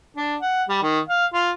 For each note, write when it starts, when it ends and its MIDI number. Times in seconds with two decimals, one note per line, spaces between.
0.16 0.36 62
0.41 0.63 78
0.69 0.79 55
0.82 1.00 51
1.09 1.26 77
1.33 1.51 65